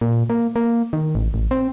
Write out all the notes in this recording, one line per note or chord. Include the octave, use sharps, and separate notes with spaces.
A#2
A#3
A#3
D#3
A1
A1
C4